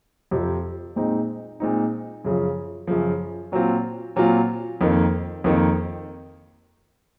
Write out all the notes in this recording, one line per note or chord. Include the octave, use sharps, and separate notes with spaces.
F2 C3 F3 C4
A#2 G#3 C4 D#4
A#2 G#3 C4 D#4
F#2 C#3 F3
F#2 C#3 F3
A#2 F#3 C4 F4
A#2 F#3 C4 F4
F2 D#3 A#3
F2 D#3 A#3